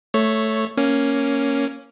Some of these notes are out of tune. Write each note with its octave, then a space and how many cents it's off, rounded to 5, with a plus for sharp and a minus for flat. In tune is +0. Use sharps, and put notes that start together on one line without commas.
A3 +0 C#5 +0
A#3 +0 C#4 +0